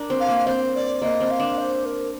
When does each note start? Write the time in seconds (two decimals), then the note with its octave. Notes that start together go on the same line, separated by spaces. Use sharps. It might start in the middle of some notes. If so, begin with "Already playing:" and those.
Already playing: D4 A#4
0.10 C4
0.20 F5
0.28 A#3
0.46 C4 C5
0.75 D5
1.02 A#3 D#5
1.20 C4
1.30 F5
1.40 D4
1.58 C5
1.85 A#4